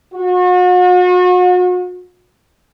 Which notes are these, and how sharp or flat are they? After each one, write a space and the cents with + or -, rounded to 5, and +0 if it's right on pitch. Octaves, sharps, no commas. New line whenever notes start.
F#4 -40